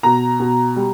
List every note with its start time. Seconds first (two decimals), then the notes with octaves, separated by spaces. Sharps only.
0.03 B2 A#5
0.40 B2
0.76 G3